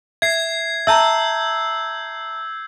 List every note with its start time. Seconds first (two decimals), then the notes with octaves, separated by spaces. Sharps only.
0.22 E5 G#6 C7
0.87 E5 A5 A#5 E6 G6